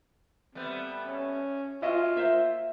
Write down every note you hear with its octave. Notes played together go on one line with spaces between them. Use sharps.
G3 A3 B3 C4
C#4
A#3 F4 F#4 D#5 E5
A#3 C5 E5